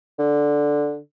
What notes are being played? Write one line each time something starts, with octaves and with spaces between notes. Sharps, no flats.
D3